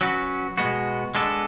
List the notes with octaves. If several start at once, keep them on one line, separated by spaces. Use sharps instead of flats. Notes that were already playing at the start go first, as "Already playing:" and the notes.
F#3 C#4 F#4 B4
B2 G#3 B3 F#4
G#3 B3 D4 A4